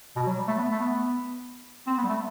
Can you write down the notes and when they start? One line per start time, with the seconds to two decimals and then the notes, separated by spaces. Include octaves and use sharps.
0.16 B2
0.27 F#3
0.37 G3
0.47 A3
0.58 B3
0.70 A3
0.80 B3
1.87 C4
1.97 B3
2.04 G3
2.09 A3